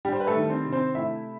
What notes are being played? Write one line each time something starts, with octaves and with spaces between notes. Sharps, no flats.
G3 G4
C5
B4
A3 A4
D#3
C4 C5
C3
C4 C5
A3 E4 E5